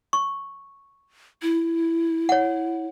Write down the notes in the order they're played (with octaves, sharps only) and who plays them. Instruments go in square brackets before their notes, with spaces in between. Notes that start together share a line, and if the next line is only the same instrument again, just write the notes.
[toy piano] C#6
[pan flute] E4
[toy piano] C#5 F#5